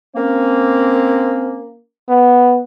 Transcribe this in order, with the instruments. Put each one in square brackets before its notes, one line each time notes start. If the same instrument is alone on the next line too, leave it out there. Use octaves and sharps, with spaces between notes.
[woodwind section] A#3 C#4 [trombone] C4
[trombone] B3